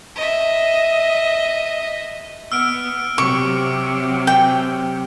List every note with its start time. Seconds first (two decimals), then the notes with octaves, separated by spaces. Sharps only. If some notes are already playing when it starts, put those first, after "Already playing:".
0.16 D#5 E5
2.52 B3 E6 F6 D7
3.18 C3 F#3 C#6 D6 D7
4.27 G5